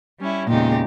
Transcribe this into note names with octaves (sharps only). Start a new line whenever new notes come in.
G3 C#4 E4
E2 A#2 C#3 G#3 D#4 G4